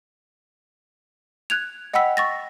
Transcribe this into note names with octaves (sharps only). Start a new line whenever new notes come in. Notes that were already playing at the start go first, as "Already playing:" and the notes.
F#6 G#6 F7
D#5 F#5 G5 B5 E6 B6
C#6 A6 A#6